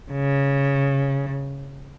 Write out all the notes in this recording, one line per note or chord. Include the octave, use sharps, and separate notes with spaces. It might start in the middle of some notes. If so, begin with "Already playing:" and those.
C#3